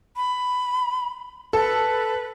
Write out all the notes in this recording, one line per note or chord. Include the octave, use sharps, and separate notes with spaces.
B5
A4 B4